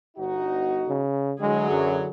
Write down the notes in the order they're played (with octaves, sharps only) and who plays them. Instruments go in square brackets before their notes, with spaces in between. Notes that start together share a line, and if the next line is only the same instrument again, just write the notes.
[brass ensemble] G1 D#4 F#4
[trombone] C#3
[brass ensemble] D3 E3 F#3 [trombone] G#3 [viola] G#4
[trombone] F#2